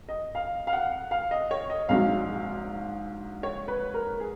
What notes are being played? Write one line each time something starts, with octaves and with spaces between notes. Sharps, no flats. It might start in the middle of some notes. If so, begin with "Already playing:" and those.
D#5
F5
F5
F#5
F5
D#5
C#5
D#5
A#1 G#2 F#3 F5
C#5
B4
A#4
G#4